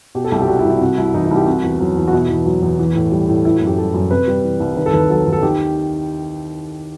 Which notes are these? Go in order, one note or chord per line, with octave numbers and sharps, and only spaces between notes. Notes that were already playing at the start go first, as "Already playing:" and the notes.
B2 G4
A4
C2 G4
G4
G3 F#4
E4
C2
E4
C3 F#4
C2 E4
E3 D#4
E4
C2
G4
C3 F#4
E2
F#3
E2
F#4
B2 E4
E2
F#3
E2
E3
A2
G3
A2
E3 E4
F#4
F#2
G4
G3 A4
F#2
C3 B4
G3
E3
C2
D#3 B4
A4
D#2 B4
F#3 A4
D#2
A4
D#3 G4